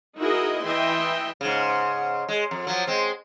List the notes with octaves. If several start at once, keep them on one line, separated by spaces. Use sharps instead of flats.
D#4 E4 F#4 G#4 A#4 D#5
E3 D#5 E5 G5 C6
G#2 C#3
G#3
F2
F3 F#3
G#3 C4